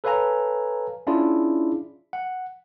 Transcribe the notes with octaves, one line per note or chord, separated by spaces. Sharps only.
A4 B4 C#5 F5 G#5 A#5
C#4 D4 E4 F4 G#4 D5
F#5